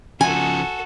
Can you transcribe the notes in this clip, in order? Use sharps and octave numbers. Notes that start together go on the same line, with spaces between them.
C#3 F3 F#4 A4 G#5